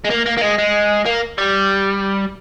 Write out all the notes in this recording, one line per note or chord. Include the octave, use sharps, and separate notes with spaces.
G#3
A#3
A#3
A#3
G#3
G#3
A#3
G3